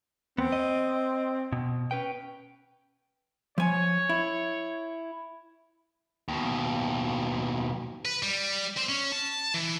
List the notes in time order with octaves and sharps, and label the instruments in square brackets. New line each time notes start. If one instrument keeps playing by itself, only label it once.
[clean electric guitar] E2 B3 [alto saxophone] C4
[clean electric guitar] D#5
B2
C#4 B4 G5
[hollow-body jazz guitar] F3 G#5 [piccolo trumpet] C#5
[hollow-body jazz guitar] E4
[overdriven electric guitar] D#2 B2
[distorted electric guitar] B4
G3
C4
C#4
A5
E3